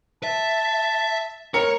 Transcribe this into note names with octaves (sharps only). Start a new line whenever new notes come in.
E5 A5
A#4 C#5 C#7